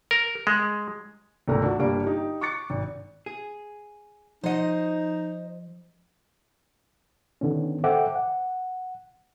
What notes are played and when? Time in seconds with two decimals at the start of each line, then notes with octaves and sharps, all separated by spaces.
0.11 A#4
0.47 G#3
1.48 G#1 C#2 A3 A#4 A#5
1.62 D4 F#4
1.79 G1 G3 A#3 D4 F5 D7
2.04 D#4 G4
2.41 C#6 D6 F#6 A6 C#7
2.70 G#1
3.26 G#4
4.44 F3 D#4 C5 D#5 F#5
7.41 D3 D#3 B3 C#4
7.84 A4 C5 E5 F#5 G5 D6
8.15 F#5